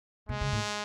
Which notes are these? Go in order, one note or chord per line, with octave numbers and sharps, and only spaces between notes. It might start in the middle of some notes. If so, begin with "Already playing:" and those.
B2 G#3
C#3
A2